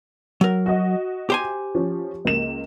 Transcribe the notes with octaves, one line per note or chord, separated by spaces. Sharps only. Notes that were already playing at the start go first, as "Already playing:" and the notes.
F#3 A#4
F#4 D#5
G4 C5 G#5
F3 C#4
C#2 A#3 E7